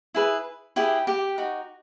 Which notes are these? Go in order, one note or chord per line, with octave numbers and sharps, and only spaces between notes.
E4 G#4 B4
E4 G4 G#4 B4 G5
G4 G5
D#4 F#4